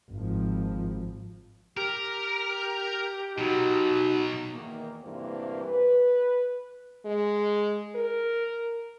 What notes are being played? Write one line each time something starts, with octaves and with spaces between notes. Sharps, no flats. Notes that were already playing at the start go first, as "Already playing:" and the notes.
G#1 F3
G4 A#4
B2 F#3 D#4 F#4
E2 D#3 A#3
D2 G2 C3 E3 A#3 C5
B4
G#3
A#4